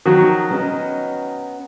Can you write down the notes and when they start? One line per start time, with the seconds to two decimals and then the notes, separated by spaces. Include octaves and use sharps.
0.06 D#3 F3 F#3 F#4
0.50 B3 C#4 D#5